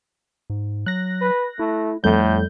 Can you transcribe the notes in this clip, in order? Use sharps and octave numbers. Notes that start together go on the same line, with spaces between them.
G#2
F#3 F#6 A#6
B4
A3 E4
F2 A2 G3 A3 G6